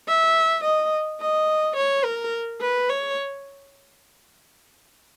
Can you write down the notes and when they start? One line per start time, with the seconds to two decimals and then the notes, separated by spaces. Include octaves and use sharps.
0.08 E5
0.65 D#5
1.21 D#5
1.77 C#5
2.05 A#4
2.61 B4
2.89 C#5